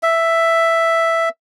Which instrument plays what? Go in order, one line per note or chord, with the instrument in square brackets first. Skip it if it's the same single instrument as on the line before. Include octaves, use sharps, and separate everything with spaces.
[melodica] E5